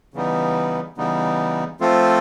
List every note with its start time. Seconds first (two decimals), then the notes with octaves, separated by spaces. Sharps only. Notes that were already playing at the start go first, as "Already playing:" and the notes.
0.14 C#3 E3 G3 B3 D#4
0.97 C#3 E3 G3 B3 D#4
1.80 F3 A3 C4 F4 A4